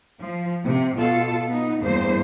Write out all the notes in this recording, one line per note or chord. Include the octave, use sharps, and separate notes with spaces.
F3
C3
B2 F4 A4
B3 D#4
E2 G2 A#3 C5